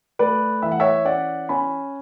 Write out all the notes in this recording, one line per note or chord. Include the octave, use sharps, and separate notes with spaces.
A3 B4 D5
E3 E5
F#5
C#5 E5
C#4 D5 F#5
C#4 G#5 B5